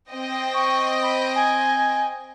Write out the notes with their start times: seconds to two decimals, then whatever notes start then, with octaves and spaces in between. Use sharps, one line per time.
0.10 C4 D#5 G5
0.53 C#6
1.02 B5
1.35 G#5